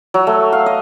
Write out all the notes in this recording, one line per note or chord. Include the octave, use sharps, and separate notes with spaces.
F#3
A3
F5
D#5